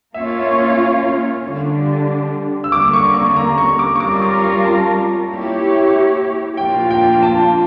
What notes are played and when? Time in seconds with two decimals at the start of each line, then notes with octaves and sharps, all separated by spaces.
0.14 A#3 C#4 F4 C#5 E5
0.39 E5
0.47 F5
0.79 F5
1.43 D3 G3 D4
2.64 E6
2.72 D3 G3 A#3 C#4 D6
2.93 C#6
3.14 C#6
3.36 A#5
3.58 C#6
3.79 D6
3.96 C#6
4.00 G3 C#4 F4 A#4 D6
4.22 D6
4.44 C#6
4.64 A5
5.29 A#3 E4 G4 C#5
6.57 A#2 F3 A#3 D4 F4 G5
6.91 G5
7.23 A5